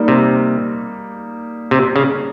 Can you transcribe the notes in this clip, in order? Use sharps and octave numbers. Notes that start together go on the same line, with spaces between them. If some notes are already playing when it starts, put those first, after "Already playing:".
Already playing: G3 A#3 D#4
C3
C3
C#3